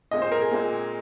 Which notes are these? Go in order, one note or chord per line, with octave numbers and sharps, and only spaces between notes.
A#2 G#3 C4 D#5
C5
A#4
G#4
A#2 G#3 C4